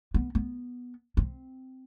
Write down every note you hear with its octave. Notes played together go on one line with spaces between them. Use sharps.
B3
B3
C4